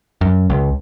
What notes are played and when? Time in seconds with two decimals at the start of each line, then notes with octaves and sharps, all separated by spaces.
0.21 F#2
0.50 C#2